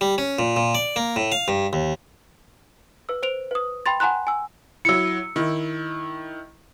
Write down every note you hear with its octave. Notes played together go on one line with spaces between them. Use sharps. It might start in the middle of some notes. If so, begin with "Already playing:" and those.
G3
C#4
A#2
A#2
D5
A#3
A2
F5
G2
D#2
B4 E6
C5 D7 F7
B4 D#6
G5 B5 C6 A6
F#5 G#5 A#5 C6 F#6
G#5 E6
F#3 E4 E6 C#7
D#3 E4